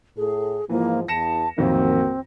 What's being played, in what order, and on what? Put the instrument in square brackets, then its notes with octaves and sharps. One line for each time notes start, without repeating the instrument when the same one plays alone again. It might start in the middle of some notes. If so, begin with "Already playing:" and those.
[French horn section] A2 A4 [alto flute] G#4
[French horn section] G#2 F3 [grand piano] E3 [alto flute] A#3
[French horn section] E2 [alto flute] A5 [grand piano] A#6 C#7 E7
[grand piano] A1 F2 D#3 [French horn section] A#3 F#4 [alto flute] C4